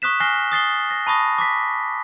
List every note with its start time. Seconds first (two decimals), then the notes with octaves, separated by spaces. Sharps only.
0.02 C#6 D#6 F#6 B6 E7
0.20 G#5 F6 F#6 A#6 C7 G7
0.52 D#6 A6 C7 G7
0.91 A#6
1.07 A5 B5 C#6 D#6 A#6
1.39 D6 B6